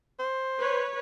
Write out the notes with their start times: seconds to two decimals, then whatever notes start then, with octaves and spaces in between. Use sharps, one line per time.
0.19 C5
0.58 B4 C#5